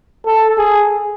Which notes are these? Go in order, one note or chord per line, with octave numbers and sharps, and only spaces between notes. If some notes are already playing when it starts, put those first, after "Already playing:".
A4
G#4